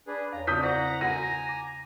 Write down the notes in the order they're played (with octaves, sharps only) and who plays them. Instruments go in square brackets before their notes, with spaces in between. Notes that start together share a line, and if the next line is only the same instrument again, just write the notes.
[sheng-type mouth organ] D4 G#4 B4
[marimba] E2 C#5 [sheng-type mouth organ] A#5
[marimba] C#3 C4 [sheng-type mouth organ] D5 [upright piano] D#6 G6 B6
[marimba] E4 C5 D5 [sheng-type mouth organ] F#5 A#5
[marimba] F#5 [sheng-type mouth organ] G#5 A#5 [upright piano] A#6
[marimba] D6